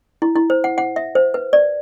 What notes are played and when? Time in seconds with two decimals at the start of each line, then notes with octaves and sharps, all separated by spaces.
0.22 E4
0.36 E4
0.50 C5
0.64 F#5
0.78 F#5
0.96 E5
1.15 C5
1.34 B4
1.53 D5